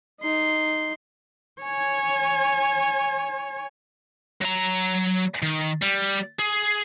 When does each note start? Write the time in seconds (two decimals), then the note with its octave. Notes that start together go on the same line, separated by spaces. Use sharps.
0.21 D#4 C6
1.62 C#5 G#5
4.41 F#3 A#5
5.42 D#3
5.82 G3
6.39 G#4